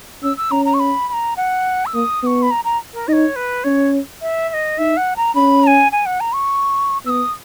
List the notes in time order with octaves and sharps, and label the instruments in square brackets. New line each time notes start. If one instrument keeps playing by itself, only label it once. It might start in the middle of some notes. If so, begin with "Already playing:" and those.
[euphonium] C#4 [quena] E6
[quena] E6
[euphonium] C#4 [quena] A#5
[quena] A#5
C#6
B5
B5
A#5
F#5
E6
[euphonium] A#3 [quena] D#6
[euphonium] B3 [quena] C#6 D#6
[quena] B5
A#5
A#5
A#4
[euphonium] D#4 [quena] C#5 D#5
[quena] B4
[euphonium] C#4 [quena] C#5
[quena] E5
E5
D#5
[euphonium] D#4 [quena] E5
[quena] F#5
A#5
[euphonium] C#4 [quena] B5
[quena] A#5
G#5
G#5
F#5
A#5
C#6
[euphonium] B3 [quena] E6
[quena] D#6